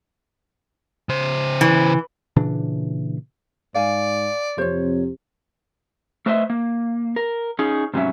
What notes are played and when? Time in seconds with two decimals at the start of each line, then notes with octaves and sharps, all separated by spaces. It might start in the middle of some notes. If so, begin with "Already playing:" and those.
1.09 C#3 C5
1.61 E3
2.36 A#2 C#3 E3 D4
3.75 G#2 D5 F5 G#5
4.58 F2 C3 C5 C#5
6.26 A3 B4 C5 D#5 E5
6.50 A#3
7.16 A#4
7.59 C#4 D#4 G#4
7.94 G#2 C3 F#3 G3 C#4 E5